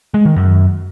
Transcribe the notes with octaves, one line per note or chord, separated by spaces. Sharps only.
G#3
D#3
F#2